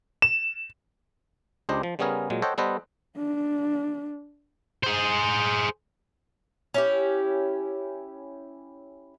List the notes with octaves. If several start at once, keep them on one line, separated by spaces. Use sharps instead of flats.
E7
C#2 D4 G4 C5 D#5
F3
C#3 G3 B3 C#4 G#4 A#4
A#2 F#3 G#3
A4 C5 C#5 D#5 F#5 G5
G3 B3 A4 B4 C5 D#5
D4
G#4 C5
C#4 E4 G4